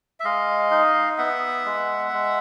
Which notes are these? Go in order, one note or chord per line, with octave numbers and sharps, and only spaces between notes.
E5
G#3 D#5 F5
D#4
B3 E5 F#5
G#3
G#3